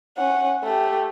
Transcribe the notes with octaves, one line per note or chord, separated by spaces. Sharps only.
C#4 F#5
A3 G4